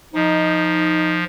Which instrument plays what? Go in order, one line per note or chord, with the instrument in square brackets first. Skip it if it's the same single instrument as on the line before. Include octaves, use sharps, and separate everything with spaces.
[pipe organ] F3 [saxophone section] D#4